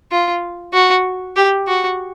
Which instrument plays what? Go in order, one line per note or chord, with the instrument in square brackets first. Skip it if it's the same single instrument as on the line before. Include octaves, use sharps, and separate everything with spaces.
[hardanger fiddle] F4
F#4
G4
F#4